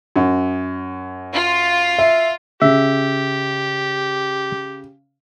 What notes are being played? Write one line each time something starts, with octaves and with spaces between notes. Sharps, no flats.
F#2
F4
E5
C#3 G4 E5